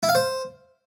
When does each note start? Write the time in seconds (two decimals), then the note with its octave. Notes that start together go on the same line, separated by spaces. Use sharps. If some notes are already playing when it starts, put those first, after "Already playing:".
0.03 E4
0.09 F5
0.15 C5